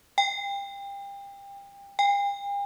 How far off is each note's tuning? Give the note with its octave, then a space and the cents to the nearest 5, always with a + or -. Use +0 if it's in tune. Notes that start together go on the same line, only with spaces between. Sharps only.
G5 +30
G5 +45